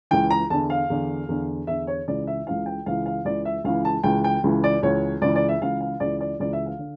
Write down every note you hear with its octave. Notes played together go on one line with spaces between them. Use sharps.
C#2 C#3 E3 G5
A#5
E2 D3 A5
F5
E2 D3
E2 D3
E2 D3 E5
C#5
C#2 C#3 E3 D5
E5
C#2 C#3 E3 F5
G5
C#2 C#3 E3 F5
F5
C#2 C#3 E3 D5
E5
C#2 C#3 E3 F5
A5
C#2 C#3 E3 G5
G5
C#2 C#3 E3
D5
C#2 C#3 E3 C#5
C#2 C#3 E3 D5
D5
E5
C#2 C#3 E3 F5
F5
C#2 C#3 E3 D5
D5
C#2 C#3 E3 D5
E5
F5
D3